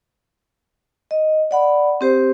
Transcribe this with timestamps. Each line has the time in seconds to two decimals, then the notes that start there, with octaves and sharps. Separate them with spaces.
1.11 D#5
1.51 D5 F#5 B5
2.01 C4 G4 C5